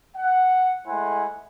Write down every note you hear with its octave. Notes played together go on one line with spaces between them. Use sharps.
F#5
G#3 A3 E4 C5 F#5 G#5